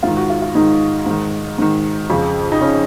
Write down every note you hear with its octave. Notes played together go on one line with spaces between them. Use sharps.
G#2 D#3 F4
F#4
F4
F4
G#2 D#3 D#4
G#2 D#3
G#2 D#3
F2 C#3
D#4
C#3 C#4